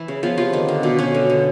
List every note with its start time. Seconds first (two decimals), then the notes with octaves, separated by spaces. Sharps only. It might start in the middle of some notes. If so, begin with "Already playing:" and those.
Already playing: E3 E4
0.08 C#3
0.23 F3 B3 F4
0.38 C3 F3 F4
0.53 D3 D#3 D#4
0.68 D3
0.83 B2 D4
0.98 B2 C#4
1.15 D3
1.30 D3